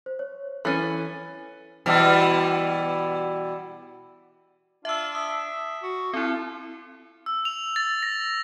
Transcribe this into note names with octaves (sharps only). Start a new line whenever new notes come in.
C5
C#5
E3 C#4 A4 A6 D#7
B2 E3 G3
D4 F4 E5 E6
E5 D#6
F#4
C4 E4 F4 A4
E6
F7
A6
A#6